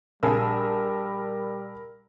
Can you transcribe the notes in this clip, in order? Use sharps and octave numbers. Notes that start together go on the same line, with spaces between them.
A#1 G3 G#4 A#4 B5 E6